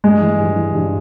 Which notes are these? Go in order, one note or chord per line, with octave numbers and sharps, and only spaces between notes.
G2 G#3
E3
G2
E3
G2